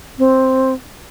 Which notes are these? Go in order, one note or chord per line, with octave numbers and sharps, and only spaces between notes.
C4